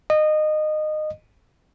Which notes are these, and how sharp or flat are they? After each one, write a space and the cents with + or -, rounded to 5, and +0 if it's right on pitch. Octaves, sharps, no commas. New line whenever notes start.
D#5 -20